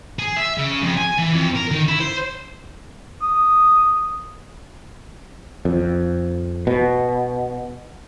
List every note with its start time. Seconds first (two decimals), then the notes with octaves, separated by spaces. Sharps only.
0.19 G#4
0.37 E5
0.57 C#3
0.82 F2
0.97 G#5
1.18 E3
1.34 F2
1.56 A#4
1.72 D#3
1.88 E4
2.01 C5
3.22 D#6
5.65 F2
6.67 B2